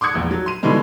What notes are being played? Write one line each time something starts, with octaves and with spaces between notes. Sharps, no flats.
C6 D6 D#6 F#6 G#6 C#7
E1 A#1 E2
F#3
C6 D#7
G2 B2 D3 E3 G3 G#3